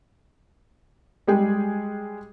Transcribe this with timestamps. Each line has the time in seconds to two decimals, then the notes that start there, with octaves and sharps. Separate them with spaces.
1.27 G3 G#3 G#4 G5